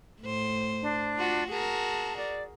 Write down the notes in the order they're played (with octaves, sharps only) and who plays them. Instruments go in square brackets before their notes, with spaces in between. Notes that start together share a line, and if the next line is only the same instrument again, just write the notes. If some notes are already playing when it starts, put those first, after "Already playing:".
[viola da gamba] A2 C5
[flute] D4
[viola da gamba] F4 F#4
[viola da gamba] F#4 G#4 A#4 [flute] A5
[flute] D5